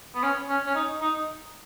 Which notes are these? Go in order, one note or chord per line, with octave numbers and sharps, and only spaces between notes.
B3
C#4
C#4
C#4
D#4
D#4